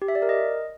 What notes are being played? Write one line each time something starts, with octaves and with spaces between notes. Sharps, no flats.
G4
E5
D5
A#4
D#5